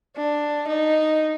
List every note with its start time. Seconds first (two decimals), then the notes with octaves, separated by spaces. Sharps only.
0.17 D4
0.68 D#4